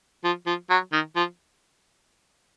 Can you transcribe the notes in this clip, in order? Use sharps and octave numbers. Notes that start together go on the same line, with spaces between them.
F3
F3
F#3
D#3
F3